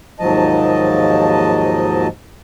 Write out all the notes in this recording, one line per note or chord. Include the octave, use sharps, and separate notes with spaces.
D#2 G#2 F3 F#3 D#5 A5